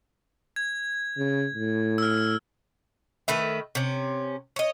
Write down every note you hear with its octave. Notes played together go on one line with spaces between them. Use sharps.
G#6
C#3
A2
E6 F6
D#3 A3 B4 E5
C3 C#4
C#5 D#5